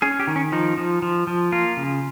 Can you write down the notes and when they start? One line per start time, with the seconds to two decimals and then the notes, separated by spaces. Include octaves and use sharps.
0.02 C#4 G#4
0.20 G4
0.27 D#3
0.36 C#4
0.52 F3 D#4
0.77 F3
1.02 F3
1.27 F3
1.52 A#3 F4
1.77 C#3